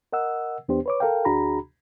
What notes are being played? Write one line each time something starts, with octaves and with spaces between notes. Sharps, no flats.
A#4 D#5 F#5 E6
E2 B3 D4 G4 C5
B4 C#5 D6
A4 A#4 F5 G5
D2 D4 F#4 G#4 A#5 B5